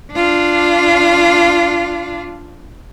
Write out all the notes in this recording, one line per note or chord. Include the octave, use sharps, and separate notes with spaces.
D4 F4